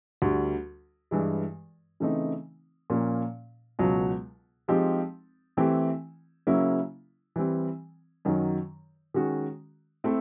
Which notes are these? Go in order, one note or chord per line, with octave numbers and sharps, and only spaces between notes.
D2 D3 G3
G2 E3 G#3
C#3 E3 A3 C4 D#4
A#2 F3 A#3 C#4
C#2 B2 F#3
F3 G#3 C4 D#4 G4
E3 A3 C4 E4 G4
C#3 F#3 A#3 C#4 E4
E3 G3 C4
F#2 D#3 F#3
D#3 G#3 C#4 F#4
A3 C4 E4